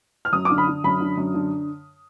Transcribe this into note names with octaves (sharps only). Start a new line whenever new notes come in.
F6
F#2 D#6
D6
D3
B5
D3
F#2 B5
D3
F#2
D3